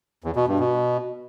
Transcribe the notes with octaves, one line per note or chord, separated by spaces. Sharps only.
E2
B2
G2
B2